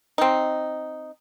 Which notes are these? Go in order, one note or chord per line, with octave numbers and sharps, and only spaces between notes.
C4 D#4